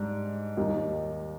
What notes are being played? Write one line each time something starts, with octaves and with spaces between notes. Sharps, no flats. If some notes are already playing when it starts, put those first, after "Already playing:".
Already playing: G#2 G3 D4
D#2 D#3 G3 A#3 D#4